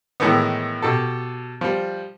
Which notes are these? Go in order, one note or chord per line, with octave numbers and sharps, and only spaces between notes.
A2 D#3 E3 G#3 B3
B2 G4 A4
F3 G3